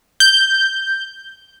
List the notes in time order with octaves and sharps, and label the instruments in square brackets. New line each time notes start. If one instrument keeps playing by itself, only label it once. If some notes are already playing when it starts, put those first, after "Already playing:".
[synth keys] G6